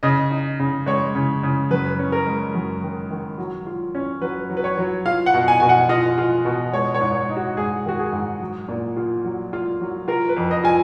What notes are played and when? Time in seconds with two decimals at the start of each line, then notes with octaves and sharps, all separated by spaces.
0.03 C#3 D#5
0.31 D#4
0.60 C#3
0.86 G#3 C#5
1.15 C#3
1.43 C#3
1.71 F#2 B4
1.99 C#4
2.12 A#4
2.27 G#3
2.55 F#2
2.82 D#3
3.11 D#3
3.38 F#3
3.66 F4
3.95 C#4
4.21 F#3 B4
4.50 F#3
4.57 B4
4.64 C#5
4.78 F#3
5.06 F4 F5
5.26 F#5
5.34 B2
5.48 G#5
5.60 B2 G#5
5.69 F#5
5.89 F4 D#5
6.18 F4
6.45 B2
6.73 G#3 C#5
6.94 C#5
7.01 G#2
7.15 C#5
7.29 D#4
7.36 F#4
7.57 G#2 G#4
7.85 D#3 F#4
7.99 G#4
8.12 G#2
8.40 F#3
8.68 A#2
8.97 F4
9.24 F#3
9.53 F4
9.81 F#3
10.08 F4 A#4
10.29 B4
10.37 F2
10.51 D#5
10.64 F4 G#5